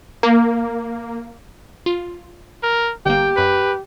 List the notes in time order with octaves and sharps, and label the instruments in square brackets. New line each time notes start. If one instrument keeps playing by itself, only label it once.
[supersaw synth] A#3
[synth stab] F4
[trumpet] A#4
[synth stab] G1 A#3 [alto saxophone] G4 [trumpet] G5
[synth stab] F#2 F#6 B6 [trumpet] B4